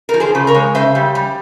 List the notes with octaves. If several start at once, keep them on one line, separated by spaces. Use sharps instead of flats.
F3 A#4
G#4 C5
C#3
A#4 C#5
G#3
C#3 C5 E5
G3
G3